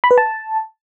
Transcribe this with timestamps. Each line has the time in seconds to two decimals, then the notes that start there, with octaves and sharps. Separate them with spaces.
0.04 B5
0.11 B4
0.18 A5